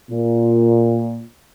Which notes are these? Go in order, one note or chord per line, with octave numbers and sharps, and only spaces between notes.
A#2